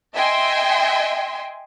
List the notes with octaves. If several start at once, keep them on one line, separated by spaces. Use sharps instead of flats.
D#5 E5 G5 G#5 C6